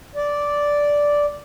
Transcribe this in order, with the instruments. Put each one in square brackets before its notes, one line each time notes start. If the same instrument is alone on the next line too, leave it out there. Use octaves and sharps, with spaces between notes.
[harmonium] D5